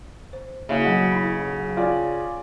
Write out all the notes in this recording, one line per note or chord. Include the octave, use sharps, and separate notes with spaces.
C5
C#3 A#3 E4 F#4 E5 F5 G#5
B1 F#4 D#5 F#5
E4 B5
F4 D5 G5 G#5